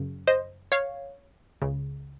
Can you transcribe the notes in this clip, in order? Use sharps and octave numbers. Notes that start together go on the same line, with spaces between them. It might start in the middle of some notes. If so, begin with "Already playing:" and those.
Already playing: F#2 C#3
C5 D#5
C#5 F5
C#2 C#3